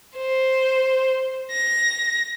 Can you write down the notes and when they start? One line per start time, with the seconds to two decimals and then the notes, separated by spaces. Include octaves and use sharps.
0.16 C5
1.51 A#6